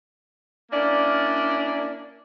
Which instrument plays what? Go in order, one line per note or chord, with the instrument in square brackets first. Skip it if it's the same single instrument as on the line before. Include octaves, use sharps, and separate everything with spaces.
[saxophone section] A#3 C#4 D4 E4 A#4 D5